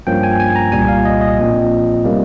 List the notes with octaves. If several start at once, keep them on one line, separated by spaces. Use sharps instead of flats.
G2 F3 A#3 C#4 G5
G#5
G#5
A#5
C2 A#2 G3 G#5
F5
D#5
D#5
A#1 A#2 F3 C4
C3 G3 A#3 C#4